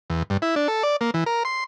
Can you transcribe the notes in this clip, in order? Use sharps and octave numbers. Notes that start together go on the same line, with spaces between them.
E2
G2
E4
D4
A4
D5
A#3
E3
A#4
C6